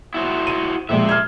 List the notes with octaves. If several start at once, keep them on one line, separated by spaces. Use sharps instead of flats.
E4 F#4 C5
D#7
A#1 F3 G#3 C5 E5
F6 G#6